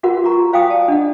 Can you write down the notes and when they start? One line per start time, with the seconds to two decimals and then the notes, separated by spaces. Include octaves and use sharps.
0.03 F4 F#4 A#4 B4 F#5
0.24 F4 F#4 A#5 C#6
0.53 C5 F5 G5 G#5 D#6
0.70 D5 A5
0.88 D4 D#5 F#5